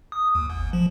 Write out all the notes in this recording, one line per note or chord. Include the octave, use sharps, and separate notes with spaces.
D#6
D#2
G1
F3